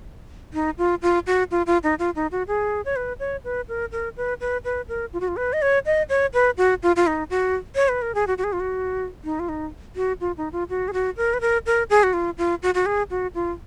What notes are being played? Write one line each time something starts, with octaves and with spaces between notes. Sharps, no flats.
D#4
F4
F4
F#4
F4
F4
D#4
F4
D#4
F#4
G#4
C#5
B4
C#5
B4
A#4
A#4
B4
B4
B4
A#4
F4
F#4
F4
B4
D#5
C#5
D#5
C#5
B4
F#4
F4
F4
D#4
F#4
C#5
B4
A#4
G#4
F#4
F#4
G#4
F4
F#4
D#4
F4
D#4
F#4
F4
D#4
F4
F#4
G#4
F#4
A#4
B4
A#4
A#4
G#4
F#4
F4
F4
F#4
F#4
G#4
F#4
F4